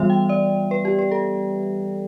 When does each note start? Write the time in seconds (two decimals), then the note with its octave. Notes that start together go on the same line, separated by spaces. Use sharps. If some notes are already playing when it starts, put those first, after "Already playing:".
Already playing: E3 G3 B3 E5
0.10 G5
0.29 D5
0.71 B4
0.85 G4
0.99 B4
1.12 A4